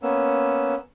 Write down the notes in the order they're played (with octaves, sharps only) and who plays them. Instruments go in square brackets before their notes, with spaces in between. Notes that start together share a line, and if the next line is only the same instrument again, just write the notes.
[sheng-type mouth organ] A#3 B3 C#4 E6